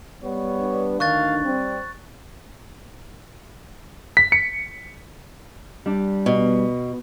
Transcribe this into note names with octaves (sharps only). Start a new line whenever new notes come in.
G3 B3 C#5
D4
D2 D#3 F5 C#6 F#6 A6
G3 C4
B6
C#7
G3 D4
B2